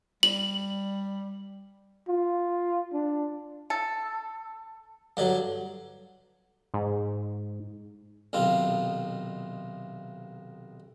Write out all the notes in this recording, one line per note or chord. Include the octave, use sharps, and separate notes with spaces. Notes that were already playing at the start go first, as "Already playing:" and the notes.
G3 F#7
F4
D4
A4
G2 D3 F#3
G#2
B1 C3 D#3 F4